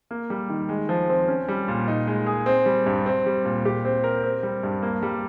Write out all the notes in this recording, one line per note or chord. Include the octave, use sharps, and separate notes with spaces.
A#3
G3
D#3
G#3
F3
C4
C#4
G3
A#2
D#4
G#3
G#4
C4
G3
G2
C4
G3
A#2
G4
C4
A#4
C4
G3
G2
A#3
G3